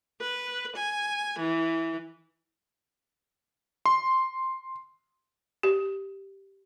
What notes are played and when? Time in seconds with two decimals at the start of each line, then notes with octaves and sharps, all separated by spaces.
0.20 B4
0.76 G#5
1.38 E3
3.86 C6
5.63 G4